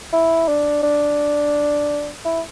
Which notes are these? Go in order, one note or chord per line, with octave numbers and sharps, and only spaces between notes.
E4
D4
D4
E4